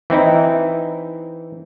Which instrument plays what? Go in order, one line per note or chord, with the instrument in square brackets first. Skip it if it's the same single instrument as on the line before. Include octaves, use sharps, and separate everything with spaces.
[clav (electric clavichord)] E3 C4 D#4 E4